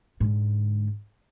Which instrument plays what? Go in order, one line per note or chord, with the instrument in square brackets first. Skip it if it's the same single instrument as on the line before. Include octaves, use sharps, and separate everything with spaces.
[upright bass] G#2 D3